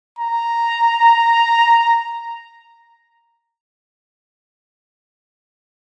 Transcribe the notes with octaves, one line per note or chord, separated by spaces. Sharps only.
A#5